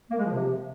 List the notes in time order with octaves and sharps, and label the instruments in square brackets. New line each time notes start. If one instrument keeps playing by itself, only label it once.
[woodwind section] A#3
G#3
F3
C3